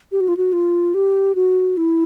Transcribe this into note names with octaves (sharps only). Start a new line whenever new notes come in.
G4
F#4
F4
F#4
F4
G4
F#4
E4